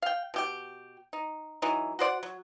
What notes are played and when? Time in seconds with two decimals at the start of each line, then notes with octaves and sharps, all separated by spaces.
0.02 F5 G5
0.34 B2 G4 G5
1.13 D#4
1.62 E3 F#3 D#4
1.99 F#4 C5 D5 F#5
2.23 F#3